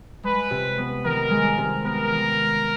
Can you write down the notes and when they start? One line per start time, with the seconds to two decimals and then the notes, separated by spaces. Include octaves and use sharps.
0.24 G#3 B4
0.51 C3
0.78 B3
1.05 D#3 A#4
1.31 G#3
1.57 C3
1.84 B3 A#4
2.12 D#3